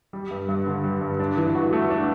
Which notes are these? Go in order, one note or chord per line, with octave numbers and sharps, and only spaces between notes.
G3
G2
G2
D3
G3
G2
D4
E3
F#4
A3
D4